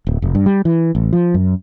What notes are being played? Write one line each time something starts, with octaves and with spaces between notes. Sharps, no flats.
D1
F1
G2
G3
E3
A1
F3
F#2